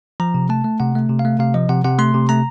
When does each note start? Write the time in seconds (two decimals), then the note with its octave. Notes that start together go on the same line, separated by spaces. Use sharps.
0.20 F3 A#5
0.34 C3
0.49 A3 A5
0.64 A3
0.80 C3 F#5
0.95 A3
1.09 C3
1.19 F5
1.25 A3
1.39 C3 F5
1.54 F3 D#5
1.69 C3 F#5
1.84 C3 F#5
1.98 A3 C6
2.14 C3
2.29 A3 A#5